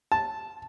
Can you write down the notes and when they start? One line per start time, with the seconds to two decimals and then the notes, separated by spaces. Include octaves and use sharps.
0.12 A5